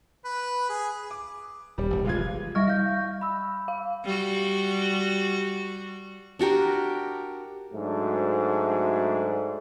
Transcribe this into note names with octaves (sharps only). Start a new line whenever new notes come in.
B4
G#4
D6
D#1 G3
E1 A#1
F1 C#3 E3 G#3 F4 G#6
G3 D#5 E5 C#6 F6 A#6
F5 G6
B5 E6
F5
G3 F#4
D4 F#4 G4 A#4
G#2 F#3 A3 D4 F#4